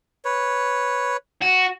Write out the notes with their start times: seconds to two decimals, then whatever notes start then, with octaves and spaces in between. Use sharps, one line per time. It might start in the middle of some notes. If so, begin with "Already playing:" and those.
0.25 B4 C#5
1.42 F#4